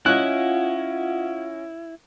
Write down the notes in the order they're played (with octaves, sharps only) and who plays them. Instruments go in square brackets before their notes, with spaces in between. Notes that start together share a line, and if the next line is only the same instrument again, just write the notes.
[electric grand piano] C#4 C#5 D#5 [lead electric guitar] E4 [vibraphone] F4 F5 F#5 [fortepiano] F#6